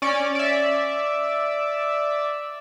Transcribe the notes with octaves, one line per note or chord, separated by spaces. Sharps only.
C#4 D5
D5 E5